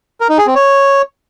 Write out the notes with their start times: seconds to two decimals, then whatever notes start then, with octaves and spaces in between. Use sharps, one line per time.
0.21 A#4
0.29 D#4
0.38 G#4
0.47 C4
0.55 C#5